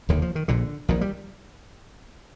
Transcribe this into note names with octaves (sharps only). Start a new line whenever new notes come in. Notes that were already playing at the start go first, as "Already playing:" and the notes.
F1 D#2 D3 D#3
F3
D#3
A#1 A#2 D3
A#1 A#2 D#3
G3